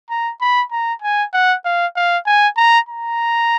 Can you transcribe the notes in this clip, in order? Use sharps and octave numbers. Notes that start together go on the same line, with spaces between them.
A#5
B5
A#5
G#5
F#5
F5
F5
G#5
A#5
A#5